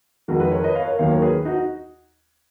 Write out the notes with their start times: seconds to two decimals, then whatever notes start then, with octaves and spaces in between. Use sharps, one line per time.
0.28 F2 D#3 G#3 F#4 A#4
0.40 G#4 B4
0.51 A#4 C#5
0.64 B4 D#5
0.75 C#5 F5
0.87 A#4 C#5
0.99 D#2 D#3 F#3 C#5 F5
1.11 A#4 C#5
1.22 G#4 B4
1.45 D#4 F#4